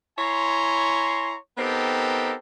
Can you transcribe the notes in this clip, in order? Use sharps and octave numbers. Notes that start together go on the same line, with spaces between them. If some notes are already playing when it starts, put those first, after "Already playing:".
E4 C#5 G#5 A#5 C6
B3 C4 D#4 G4 A4 A#4